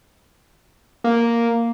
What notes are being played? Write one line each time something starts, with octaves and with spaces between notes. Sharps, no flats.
A#3